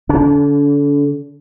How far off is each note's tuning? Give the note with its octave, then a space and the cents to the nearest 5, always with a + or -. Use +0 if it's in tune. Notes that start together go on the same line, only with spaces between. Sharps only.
D3 -25 D4 -45